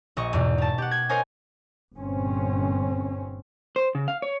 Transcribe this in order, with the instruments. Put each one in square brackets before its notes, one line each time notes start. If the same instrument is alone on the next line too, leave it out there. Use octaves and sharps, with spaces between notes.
[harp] A#1 D#5 C#6
E2 G#2 B2
D#4 A5
G4 F#5
G#6
A#4 C5 C#5 D#5 G#5
[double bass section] G1 A#2 C4 C#4
[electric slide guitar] C5
C#3
F5
C#5